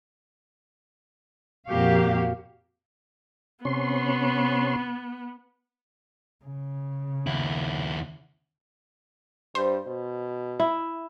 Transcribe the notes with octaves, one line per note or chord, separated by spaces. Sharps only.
F2 A#2 A#3 F#4 G4 F5
C3 B3 C#4 C6
C#3
D#2 E4
G2 C5
B2
E4